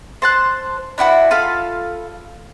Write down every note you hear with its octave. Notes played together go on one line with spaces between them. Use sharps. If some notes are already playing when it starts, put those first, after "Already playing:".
C5 A5 F#6
D4 E4 F#4 B4
F4 A4 F5 B5